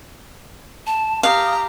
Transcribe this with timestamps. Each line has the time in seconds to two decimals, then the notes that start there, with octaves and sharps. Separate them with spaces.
0.87 A5
1.23 G4 F5 A#5 D#6